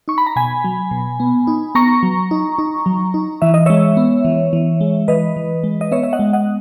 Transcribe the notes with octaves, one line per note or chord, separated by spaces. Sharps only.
D#4 C#6
B5
A#5
B2 G#5 B5
F#3
B2
B3
D#4
B3 A#5 C#6
F#3
D#4
D#4
F#3
D#4
E3 E5
D#5
G#3 C#5 E5
B3
E3
E3
G#3
E3 B4 D#5
E3
G#3
D#5
B3 C#5 E5
E5
D#5 F#5
G#3
D#5 F#5